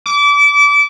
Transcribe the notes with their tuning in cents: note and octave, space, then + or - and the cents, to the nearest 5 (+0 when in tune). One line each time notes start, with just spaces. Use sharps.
D6 -30